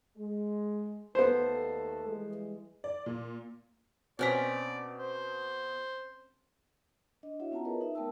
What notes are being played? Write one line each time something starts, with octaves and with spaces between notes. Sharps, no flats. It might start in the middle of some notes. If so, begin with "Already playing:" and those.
G#3
D#2 A3 B3 A4 C5
E3 G3 G#3
D5
A#2
B2 C4 C#4 D5 A#5 F6 B6
C5
D4 D#5
E4 F#4 C#5 E5 F#5
B3 C#4 F4 A5 A#5
G#4 A#4 B4 C#5 D#5
D#4 E5
A3 B3 A#4 G5 A5 E6